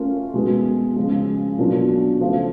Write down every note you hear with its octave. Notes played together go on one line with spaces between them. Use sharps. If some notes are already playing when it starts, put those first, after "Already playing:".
Already playing: A3 C#4 F4 A#4
B2 G#3 B3
C#3 F3 G#3
B2 F#3 A#3 D4 F4
C#3 F3 A3